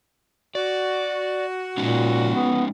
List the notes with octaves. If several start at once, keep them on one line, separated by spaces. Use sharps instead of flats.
F#4 D5
A#2 G#3 C#4 D#4
B3